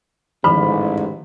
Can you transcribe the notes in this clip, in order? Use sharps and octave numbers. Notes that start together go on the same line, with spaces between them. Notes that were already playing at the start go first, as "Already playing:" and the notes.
A1 G#2 D3 D#3 F3 B5